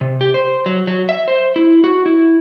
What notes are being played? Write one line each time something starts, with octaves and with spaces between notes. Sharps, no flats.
C3
G4
C5
F#3
F#3
E5
C5
E4
F#4
E4